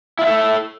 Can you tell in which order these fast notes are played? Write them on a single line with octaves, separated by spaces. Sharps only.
E4 F4 E5 A4